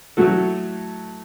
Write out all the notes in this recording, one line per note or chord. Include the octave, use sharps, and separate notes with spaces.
A2 F#3 A3 F#4 A4